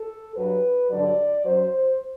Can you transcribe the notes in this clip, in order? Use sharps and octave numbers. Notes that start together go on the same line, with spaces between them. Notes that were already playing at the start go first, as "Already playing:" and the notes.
Already playing: A4
G2 F#3 B4
G2 D3 F#3 D5
F#2 F#3 C5